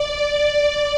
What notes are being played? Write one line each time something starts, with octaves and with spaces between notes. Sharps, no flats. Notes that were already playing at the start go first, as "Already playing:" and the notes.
Already playing: D5
D5